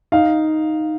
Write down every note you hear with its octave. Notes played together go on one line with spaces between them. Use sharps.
D#4 F5